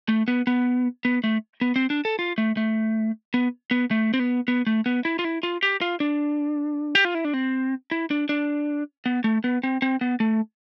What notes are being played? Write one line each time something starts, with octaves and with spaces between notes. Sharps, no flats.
A3
B3
B3
B3
A3
B3
C4
D4
A4
F4
A3
A3
B3
B3
A3
C4
B3
B3
A3
B3
E4
F4
E4
F4
G4
F4
D4
G4
F4
E4
D4
C4
E4
D4
D4
B3
A3
B3
C4
C4
B3
A3